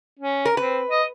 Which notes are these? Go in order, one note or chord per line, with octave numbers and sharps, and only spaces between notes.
C#4
A#4
C4 B4
D#5